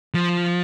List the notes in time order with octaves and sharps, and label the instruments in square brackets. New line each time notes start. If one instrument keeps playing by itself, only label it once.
[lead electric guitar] F3